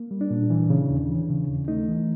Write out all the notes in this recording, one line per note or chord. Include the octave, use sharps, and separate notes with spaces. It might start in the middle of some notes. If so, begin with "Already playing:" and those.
Already playing: A#3
G3
D4
A#2
E3
C#3
D#2
E3
C#3
D#2
A3 D#4
E3